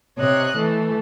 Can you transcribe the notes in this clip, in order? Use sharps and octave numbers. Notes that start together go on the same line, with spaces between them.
C3 C#5 D#5 F#6
E3 A3